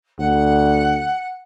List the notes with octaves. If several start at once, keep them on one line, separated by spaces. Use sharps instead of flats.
D2 F#5